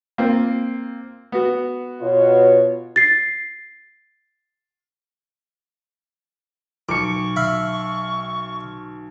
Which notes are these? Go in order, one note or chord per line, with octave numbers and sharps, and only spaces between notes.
A#3 C4 F4
B3 F#4
B2 F4 C#5
A6 C7
B1 C#6 D6 C#7
E5 F5 B5